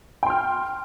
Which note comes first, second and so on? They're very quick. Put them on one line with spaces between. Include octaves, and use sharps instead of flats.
G5 C6 F6